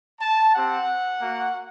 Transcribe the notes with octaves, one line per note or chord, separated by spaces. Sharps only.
A5
C4 G4 F#5
A#3 F#4